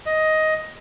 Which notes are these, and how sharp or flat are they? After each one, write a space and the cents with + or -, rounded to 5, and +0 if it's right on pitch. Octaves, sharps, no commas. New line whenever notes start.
D#5 +10